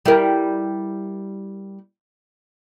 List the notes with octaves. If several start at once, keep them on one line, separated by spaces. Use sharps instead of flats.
G3 E4 A#4